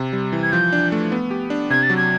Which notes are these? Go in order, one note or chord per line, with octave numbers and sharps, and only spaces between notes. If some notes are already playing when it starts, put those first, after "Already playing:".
Already playing: C3
G3
E3
G#6
F3 G6
D4
A3
B3
G4
D4
C3 G#6
A6
F#3
G#6